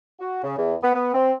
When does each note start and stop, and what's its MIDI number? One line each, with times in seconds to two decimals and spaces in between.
0.21 0.43 66
0.44 0.58 49
0.58 0.75 40
0.83 0.93 59
0.95 1.11 59
1.14 1.33 60